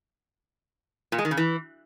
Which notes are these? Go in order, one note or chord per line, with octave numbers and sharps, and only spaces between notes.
A#2
G#3
D#3
C#3
E3